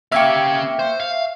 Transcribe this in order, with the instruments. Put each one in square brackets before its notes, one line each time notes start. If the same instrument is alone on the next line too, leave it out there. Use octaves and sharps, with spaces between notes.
[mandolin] A#3 G4 [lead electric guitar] C#4 F5 [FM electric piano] E5 C#6
[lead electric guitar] C5
F5